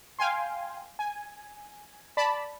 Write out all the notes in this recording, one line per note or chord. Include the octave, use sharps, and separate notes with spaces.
F5 G5 G#5 C6
G#5
D5 A5 B5